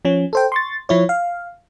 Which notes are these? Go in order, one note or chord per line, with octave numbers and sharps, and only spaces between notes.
F3 C#4
A4 C5 G5
C6 C#6 A6
F3 E4 C#5
F5